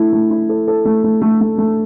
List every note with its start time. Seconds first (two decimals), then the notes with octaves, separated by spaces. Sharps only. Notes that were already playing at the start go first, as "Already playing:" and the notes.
Already playing: A3 E4
0.13 A3
0.31 E4
0.49 A4
0.68 A4
0.85 A3
1.04 A3
1.22 A3
1.41 A3
1.58 A3